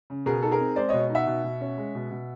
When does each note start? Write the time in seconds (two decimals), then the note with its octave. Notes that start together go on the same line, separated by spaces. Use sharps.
0.10 C#3
0.26 B2 G#4 A#4
0.42 D#4 A4
0.51 G#4 A#4
0.60 C4
0.76 G#3 C5 D5
0.89 B2 C#5 D#5
1.10 D#4
1.15 E5 F#5
1.27 B2
1.44 B2
1.61 C#4
1.78 G#3
1.95 B2
2.11 B2